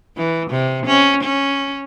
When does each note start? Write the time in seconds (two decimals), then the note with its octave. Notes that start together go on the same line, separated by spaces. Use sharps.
0.17 E3
0.51 C3
0.86 C#4
1.23 C#4